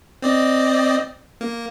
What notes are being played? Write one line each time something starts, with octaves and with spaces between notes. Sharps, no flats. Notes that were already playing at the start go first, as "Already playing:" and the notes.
C4 D5 D#5
A#3